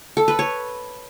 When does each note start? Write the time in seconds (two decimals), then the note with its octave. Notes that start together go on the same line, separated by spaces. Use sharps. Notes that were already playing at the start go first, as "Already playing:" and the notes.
0.17 A4
0.28 B4
0.39 C#5